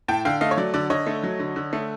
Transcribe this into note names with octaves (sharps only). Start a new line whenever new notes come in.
A2 G5 A5
D3 F5 G5
A3 D#5 F5
C#5
F#3 D5
D3 D5
D3 C#5 D#5
A3
F#3
D3
D3
A3